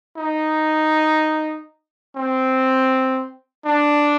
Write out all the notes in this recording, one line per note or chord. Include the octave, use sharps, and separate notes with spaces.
D#4
C4
D4